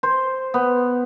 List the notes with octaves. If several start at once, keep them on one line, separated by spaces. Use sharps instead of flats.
C5
B3